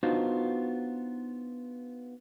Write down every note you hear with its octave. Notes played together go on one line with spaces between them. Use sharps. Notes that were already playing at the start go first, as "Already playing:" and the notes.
B3 D4 D#4 F4 F#4 C5